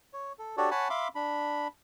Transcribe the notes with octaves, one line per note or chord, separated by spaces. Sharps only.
C#5
A4
D4 F#4 G4 A4 C#5 D5
C#5 F#5 G#5 A5 B5
E5 F5 B5 C6 D6
D4 B5